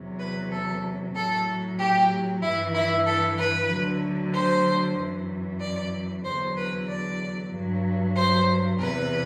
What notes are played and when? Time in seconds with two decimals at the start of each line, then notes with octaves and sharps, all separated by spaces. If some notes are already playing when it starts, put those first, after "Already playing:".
Already playing: E2 C3 F#3
0.19 B4
0.51 A4
1.14 A2 F#3 A4
1.78 G4
2.42 G2 E3 E4
2.74 E4
3.06 A4
3.38 B4
3.69 D2 D3 F#3
4.33 C5
4.97 F#2 E3
5.60 D5
6.24 E2 D3 F#3 C5
6.56 B4
6.88 D5
7.51 G2 F#3
8.15 C5
8.79 E2 C3 E3 B4